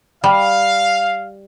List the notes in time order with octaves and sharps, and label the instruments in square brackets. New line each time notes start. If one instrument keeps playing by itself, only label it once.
[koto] G3 [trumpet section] F5